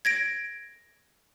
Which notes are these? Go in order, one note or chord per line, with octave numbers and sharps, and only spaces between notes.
G#6 A#6 D7